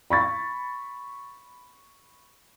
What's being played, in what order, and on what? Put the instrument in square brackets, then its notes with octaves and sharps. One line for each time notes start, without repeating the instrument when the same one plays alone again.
[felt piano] B5 C#6 A6